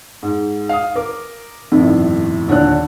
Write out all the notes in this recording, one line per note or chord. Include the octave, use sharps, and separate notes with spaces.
G#2
F5 D#6
A#4 D6
G1 F2 A2 C3 D#3
D#2 A#2 D3 D4 C#5 F#6